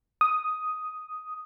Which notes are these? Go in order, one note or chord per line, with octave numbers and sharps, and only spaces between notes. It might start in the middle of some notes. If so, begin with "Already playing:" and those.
D#6